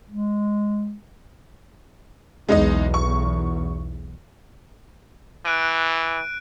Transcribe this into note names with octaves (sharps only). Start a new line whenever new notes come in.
G#3
B1 E2 G#3 D#4 D#5
C#6
E3 F#6 D7 D#7